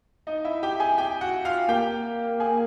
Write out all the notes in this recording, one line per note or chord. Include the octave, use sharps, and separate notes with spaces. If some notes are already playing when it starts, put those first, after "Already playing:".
D#4 D#5
E4 E5
G4 G5
G#4 G#5
G4 G5
F#4 F#5
F4 F5
A#3 G4 G5
G#4 G#5